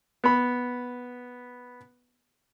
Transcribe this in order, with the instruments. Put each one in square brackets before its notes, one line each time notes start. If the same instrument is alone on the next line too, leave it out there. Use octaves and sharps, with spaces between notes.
[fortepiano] B3 B5